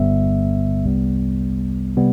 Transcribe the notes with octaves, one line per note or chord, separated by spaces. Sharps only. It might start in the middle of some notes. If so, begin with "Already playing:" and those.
Already playing: G1 G2 D3 G3 B3 E5
C2 C3 G3 B3
C3 G3 B3